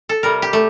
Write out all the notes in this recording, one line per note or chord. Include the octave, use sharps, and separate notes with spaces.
A4
C3 G3 A#4
G4
A3